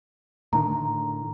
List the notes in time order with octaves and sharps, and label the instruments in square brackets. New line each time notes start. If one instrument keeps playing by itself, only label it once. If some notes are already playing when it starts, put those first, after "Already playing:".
[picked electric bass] A2 D3 D#3 [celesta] A#5